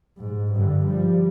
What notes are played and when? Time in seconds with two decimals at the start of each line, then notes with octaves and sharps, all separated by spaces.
0.17 G#2
0.52 G2 D3
0.86 F3 G3